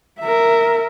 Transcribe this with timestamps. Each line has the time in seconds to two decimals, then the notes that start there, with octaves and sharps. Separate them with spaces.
0.20 A#4 E5